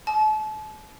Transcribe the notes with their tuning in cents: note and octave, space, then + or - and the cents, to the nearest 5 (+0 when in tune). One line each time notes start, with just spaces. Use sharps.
A5 -40